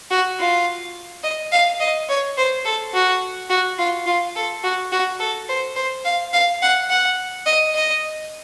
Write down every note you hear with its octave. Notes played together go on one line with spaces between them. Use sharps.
F#4
F4
D#5
F5
D#5
C#5
C5
A4
F#4
F#4
F4
F4
A4
F#4
F#4
A4
C5
C5
F5
F5
F#5
F#5
D#5
D#5